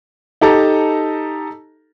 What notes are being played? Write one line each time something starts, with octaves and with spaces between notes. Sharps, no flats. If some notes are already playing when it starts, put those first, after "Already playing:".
D#4 G4 A4 A5 A#5